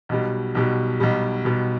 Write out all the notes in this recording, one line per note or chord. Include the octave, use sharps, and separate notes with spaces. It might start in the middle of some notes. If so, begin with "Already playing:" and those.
B1 B2 G3
B1 B2 G3
B1 B2 G3
B1 B2 G3